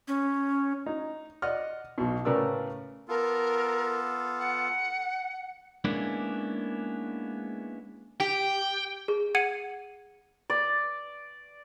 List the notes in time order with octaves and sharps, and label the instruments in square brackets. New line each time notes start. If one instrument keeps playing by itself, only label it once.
[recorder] C#4
[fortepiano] D#4
D5 D#5 F#5 F6
B1 B2
A2 C#3 A#4 B4 D5 E6
[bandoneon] B3 F4 A4 [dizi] A#4
[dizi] F#5
[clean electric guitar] G#3 A#3 B3 C#4 D4 E4
[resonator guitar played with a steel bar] G4 [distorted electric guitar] G5
[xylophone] G#4
F#5 G#6 C#7 D#7
[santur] D5